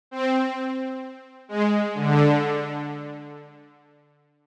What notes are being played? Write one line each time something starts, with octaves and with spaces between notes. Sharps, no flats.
C4
G#3
D3